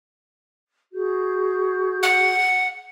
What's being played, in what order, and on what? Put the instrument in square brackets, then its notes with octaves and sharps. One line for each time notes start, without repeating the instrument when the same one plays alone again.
[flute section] F#4 G#4 G6
[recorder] F#5